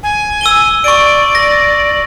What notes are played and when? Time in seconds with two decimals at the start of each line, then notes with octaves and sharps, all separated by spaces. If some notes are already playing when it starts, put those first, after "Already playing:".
0.03 G#5
0.41 E6 D#7 G7
0.84 D5 C#6 D7
1.35 A#6